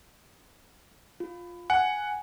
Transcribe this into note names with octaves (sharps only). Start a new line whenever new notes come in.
F4
F#5 G#5